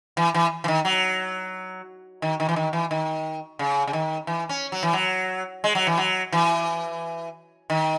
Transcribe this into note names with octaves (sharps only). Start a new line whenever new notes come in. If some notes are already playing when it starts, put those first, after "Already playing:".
E3
E3
E3
D#3
F#3
D#3
D#3
E3
D#3
E3
D#3
C#3
C#3
D#3
E3
C#4
F#3
E3
F#3
G#3
F#3
E3
F#3
E3
D#3